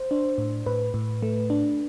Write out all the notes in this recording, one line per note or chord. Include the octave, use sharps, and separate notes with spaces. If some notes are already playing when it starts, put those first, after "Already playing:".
Already playing: C5
D4
A2
A2 B4
A2
A3
D4